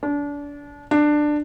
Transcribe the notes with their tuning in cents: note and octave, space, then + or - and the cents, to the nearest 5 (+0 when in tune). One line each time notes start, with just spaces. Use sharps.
D4 -30
D4 +15